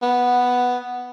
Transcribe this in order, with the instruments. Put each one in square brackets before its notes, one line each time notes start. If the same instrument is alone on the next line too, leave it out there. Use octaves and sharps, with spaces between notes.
[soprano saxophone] B3